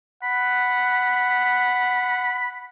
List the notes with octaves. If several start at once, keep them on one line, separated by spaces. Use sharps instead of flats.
F#5 B5